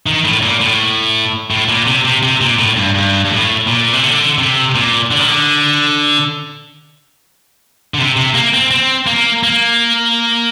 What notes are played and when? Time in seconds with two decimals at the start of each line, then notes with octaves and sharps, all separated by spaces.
0.06 D#3
0.25 A2
0.43 A#2
0.61 A2
1.51 A2
1.69 A#2
1.87 C3
2.05 C3
2.23 C3
2.41 A#2
2.59 A2
2.77 G2
2.95 G2
3.25 G2
3.30 A2
3.67 A#2
3.93 C3
4.03 D3
4.38 C3
4.75 A#2
5.11 D3
5.19 D#3
5.27 D3
7.94 D3
7.99 C3
8.16 C3
8.35 A#3
8.53 C4
8.71 C4
9.07 A#3
9.43 A#3